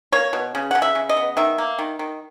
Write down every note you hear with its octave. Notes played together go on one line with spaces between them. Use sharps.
A#3 C#5
B2
C#3
C#3 F#5
E5
C#3
D#5
B3
D#3 E5
A#3
D#3
D#3